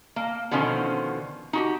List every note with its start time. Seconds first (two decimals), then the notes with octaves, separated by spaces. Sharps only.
0.16 A#3
0.51 B2 D3 D#3 F3 C#4 C5
1.53 D#4 F#4 G4